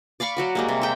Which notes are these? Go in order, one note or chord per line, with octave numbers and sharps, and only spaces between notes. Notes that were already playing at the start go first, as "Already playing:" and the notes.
D5 F5 B5 C#6
F#3 F#4 D5
G3 G#3 A#3
C3
E5 G5